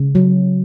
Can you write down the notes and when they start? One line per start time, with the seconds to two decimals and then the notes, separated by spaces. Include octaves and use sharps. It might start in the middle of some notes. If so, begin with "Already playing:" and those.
Already playing: C#3
0.15 F#3